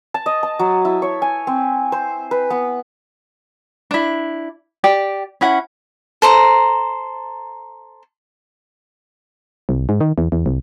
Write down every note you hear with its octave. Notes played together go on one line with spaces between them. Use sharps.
A5
D#5
A5
F#3
E4
C#5
G#5
C4
C5
B4
B3
D4 E4
G4 D5 G5
C#4 E4 F#5
A4 C5 A#5
C2
G#2
D#3
E2
E2
C2